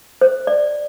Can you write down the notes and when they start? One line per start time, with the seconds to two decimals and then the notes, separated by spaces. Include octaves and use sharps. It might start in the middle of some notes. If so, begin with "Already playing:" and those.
0.21 C5
0.47 D5